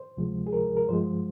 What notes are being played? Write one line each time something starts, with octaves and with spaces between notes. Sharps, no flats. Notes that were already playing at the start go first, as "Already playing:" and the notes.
Already playing: C5
D2 C3 F3 G#3
G#4
A#4
A#4
G2 F3 G#3 C5